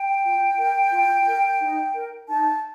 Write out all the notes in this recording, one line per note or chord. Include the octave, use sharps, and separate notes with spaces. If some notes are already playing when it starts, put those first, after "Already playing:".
Already playing: G5
F4
A#4
F4
A#4
D#4
A#4
D#4 A5